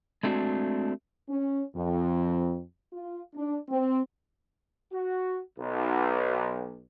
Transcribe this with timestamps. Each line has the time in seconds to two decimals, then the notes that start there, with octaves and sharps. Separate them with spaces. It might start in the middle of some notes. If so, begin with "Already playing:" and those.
0.23 G#3 A3 C4 D4 F#4
1.30 C#4
1.76 F2
2.93 F4
3.35 D4
3.69 C4
4.92 F#4
5.59 B1